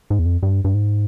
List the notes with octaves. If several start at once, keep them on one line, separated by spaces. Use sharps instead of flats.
G#2
E2
F2
G2
G2
G#2